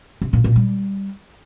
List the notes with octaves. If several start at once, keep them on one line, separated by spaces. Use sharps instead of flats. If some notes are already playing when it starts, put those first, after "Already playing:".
C3
A#2
A#2
G3